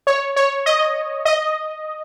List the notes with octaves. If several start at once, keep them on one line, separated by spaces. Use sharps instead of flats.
C#5
C#5
D#5
D#5